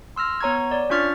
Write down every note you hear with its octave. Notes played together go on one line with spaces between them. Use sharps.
C6 E6 F6 A#6
B3 C#5 A#5 C#6 G#6
C#5 D5
C#4 D4 F4 C#6 F6 A6